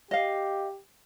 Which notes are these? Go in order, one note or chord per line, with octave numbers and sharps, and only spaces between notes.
G4 D#5 F5